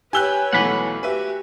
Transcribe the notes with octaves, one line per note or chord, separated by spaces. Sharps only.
G4 B4 C#5 G#5 E6 F#6 G7
B1 E3 A3 F#5 B5
F#4 G4 B4 E5